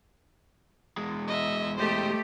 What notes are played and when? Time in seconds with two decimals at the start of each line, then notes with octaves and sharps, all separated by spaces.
0.97 E2 G#3
1.28 D#5 E5
1.77 A3 G4 C5 D#5